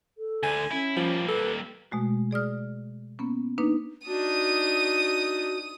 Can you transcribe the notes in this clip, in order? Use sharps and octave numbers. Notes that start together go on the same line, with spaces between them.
A4
D2 D3 G#5
C#4 E4
F3 G3 A#3
A4 B4
B2 G#3 A3 F#4
G#4 D5 D#6 F6
A#3 B3 C#4
A#3 D4 D#4 B4
D4 D#4 F#4 D#6 D#7